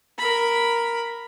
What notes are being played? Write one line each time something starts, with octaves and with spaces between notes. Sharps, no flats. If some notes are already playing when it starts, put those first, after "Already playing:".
A#4 B5